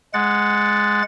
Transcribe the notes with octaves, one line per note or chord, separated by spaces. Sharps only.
G#3 F#5 A6